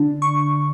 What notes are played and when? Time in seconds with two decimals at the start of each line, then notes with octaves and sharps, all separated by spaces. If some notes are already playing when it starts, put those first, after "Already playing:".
Already playing: D3 D4
0.22 C#6